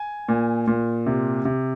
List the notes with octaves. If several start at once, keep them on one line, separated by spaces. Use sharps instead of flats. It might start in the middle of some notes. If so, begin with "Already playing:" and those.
Already playing: G#5
A#2
A#2
C3
C3